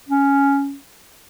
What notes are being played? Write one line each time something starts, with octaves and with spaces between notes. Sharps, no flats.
C#4